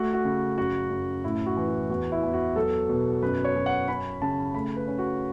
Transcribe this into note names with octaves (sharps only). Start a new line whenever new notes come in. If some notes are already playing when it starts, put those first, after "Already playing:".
Already playing: A3 F#4
F#4
C#3
F#2 F#4
F#2
A2 E4
F#4
E3
F#4
E2 F#4
E4
E2
F#4
F#3 A4
B2
F#2 B4
C#5
F#2
F#5
C#4 B5
C#3 A5
A3 B5
B4
C#4
F#4